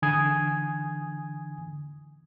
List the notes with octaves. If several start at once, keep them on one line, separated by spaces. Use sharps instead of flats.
D3 E3 G#5 D#6 G#6